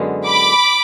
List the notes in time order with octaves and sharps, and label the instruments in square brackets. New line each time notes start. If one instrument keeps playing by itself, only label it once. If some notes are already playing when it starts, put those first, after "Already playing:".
Already playing: [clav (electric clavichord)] F#2 D3 G#3 B3
[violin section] B5 D6